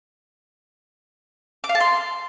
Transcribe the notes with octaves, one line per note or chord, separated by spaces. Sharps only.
D6
F5
A5
C6